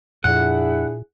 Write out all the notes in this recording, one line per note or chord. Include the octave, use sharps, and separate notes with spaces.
F2 A#2 D4 E4 G#4 F#5